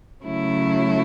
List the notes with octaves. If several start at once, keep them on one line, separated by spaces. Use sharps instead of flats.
C#3 F#3 A3 E4